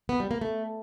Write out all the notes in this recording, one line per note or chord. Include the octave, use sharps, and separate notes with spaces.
B3
G3
A#3
A3